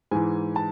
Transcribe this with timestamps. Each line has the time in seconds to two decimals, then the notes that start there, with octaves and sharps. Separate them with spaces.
0.11 G#2 E3 G#5
0.56 A5